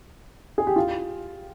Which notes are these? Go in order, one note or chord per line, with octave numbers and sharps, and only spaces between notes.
G#4
G4
F4